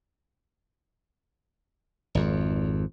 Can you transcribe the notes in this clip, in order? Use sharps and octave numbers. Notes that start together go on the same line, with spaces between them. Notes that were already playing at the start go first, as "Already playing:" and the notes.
G#1 F2